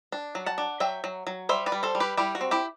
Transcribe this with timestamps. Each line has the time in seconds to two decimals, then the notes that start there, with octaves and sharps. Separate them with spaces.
0.12 D4
0.35 F#3
0.46 F#5 A5
0.58 D4
0.80 F#3 E5 G5
1.04 F#3
1.27 F#3
1.49 G3 C5 E5
1.66 B4 D5
1.72 G3
1.83 A4 C5
1.95 G3
2.00 G4 B4
2.17 G3 E4 G4
2.35 F#4
2.41 C4
2.51 E4 G4